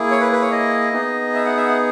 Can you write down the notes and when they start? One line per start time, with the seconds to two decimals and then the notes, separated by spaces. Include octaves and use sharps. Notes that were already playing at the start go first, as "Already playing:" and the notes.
Already playing: A#3 E4 G#4
0.11 C#5
0.20 B4
0.32 B4
0.41 C#5
0.52 D#5
0.92 B3 D#4 G#4
1.34 E5
1.45 F#5
1.57 E5
1.67 F#5